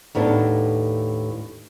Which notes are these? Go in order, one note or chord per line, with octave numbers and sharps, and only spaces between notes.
D#2 A2 B3 D4